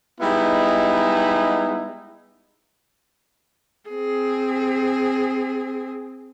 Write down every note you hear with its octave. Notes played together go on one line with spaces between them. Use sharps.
G3 G#3 B3 D#4 E4
C4 G#4